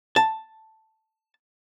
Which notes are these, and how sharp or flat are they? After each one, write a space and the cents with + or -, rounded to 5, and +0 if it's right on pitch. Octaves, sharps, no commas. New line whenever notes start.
A5 +5